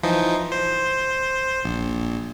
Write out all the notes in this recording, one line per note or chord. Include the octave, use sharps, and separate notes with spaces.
E3 F3 D#4
C5
A#1